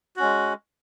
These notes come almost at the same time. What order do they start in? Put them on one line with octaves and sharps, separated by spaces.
F#4 C#4 G#3